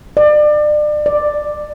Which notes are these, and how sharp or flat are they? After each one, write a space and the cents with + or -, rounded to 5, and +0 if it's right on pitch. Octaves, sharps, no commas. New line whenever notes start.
D5 +30
D5 +5